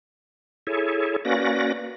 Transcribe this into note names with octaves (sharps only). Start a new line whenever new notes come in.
E4 G#4 A4 C#5
A#3 C#4 F#4 B4 D5 A#6